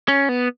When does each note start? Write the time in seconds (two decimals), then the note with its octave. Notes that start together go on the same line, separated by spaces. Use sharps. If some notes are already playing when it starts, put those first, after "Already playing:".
0.08 C#4
0.29 B3